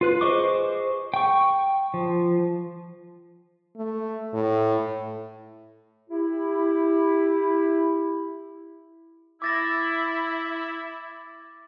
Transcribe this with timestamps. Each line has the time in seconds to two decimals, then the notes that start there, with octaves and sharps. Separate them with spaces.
0.01 F4 B4 F#6
0.21 G#4 C5 D#5 C#6 D6
1.14 G5 C#6
1.94 F3
3.77 A3
4.34 A2
6.10 E4 G4
9.42 E4 D6 A6 A#6